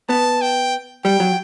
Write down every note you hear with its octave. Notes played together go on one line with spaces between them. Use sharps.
B3 A5
G5
G3 G5
F#3